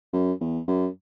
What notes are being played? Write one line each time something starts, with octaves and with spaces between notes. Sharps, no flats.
F#2
E2
F#2